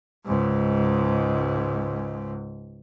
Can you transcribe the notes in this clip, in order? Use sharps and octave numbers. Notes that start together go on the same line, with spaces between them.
C#2 G#2